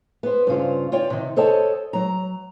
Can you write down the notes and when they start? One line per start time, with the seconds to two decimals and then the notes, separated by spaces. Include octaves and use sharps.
0.23 B3 C5
0.47 G2 C#3 F4 C5
0.92 F4 C#5 D5 G5
1.10 C3 D#3
1.36 A4 C5 C#5 D#5 G5 A5
1.93 F#3 A#5